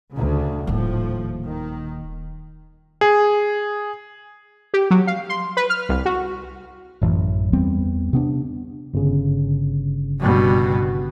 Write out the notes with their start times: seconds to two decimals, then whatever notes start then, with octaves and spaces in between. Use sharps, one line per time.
0.12 D2 C#3
0.67 D#1 D#2 A2 F3
1.46 D#3
3.01 G#4
4.74 G4
4.91 F#3
5.07 F5
5.29 C6
5.57 B4
5.70 F6
5.89 C2
6.05 F#4
7.02 A1 F#2 E3
7.53 E2 G3 B3 C4
8.13 C3 B3 D4
8.94 G1 C#3
10.20 G2 B2